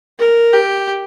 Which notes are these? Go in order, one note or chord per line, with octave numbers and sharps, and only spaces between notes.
A#4
G4